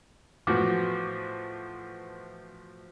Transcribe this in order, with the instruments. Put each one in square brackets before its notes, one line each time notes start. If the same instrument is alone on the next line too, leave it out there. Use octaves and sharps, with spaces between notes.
[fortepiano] A2 E3 F3 B3 F#4 D6